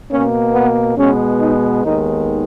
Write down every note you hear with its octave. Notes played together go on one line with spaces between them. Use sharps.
B2 A#3 C#4
B3
B2 G#3 B3 C#4
D#4
D#2 D#3 G#3 B3 D#4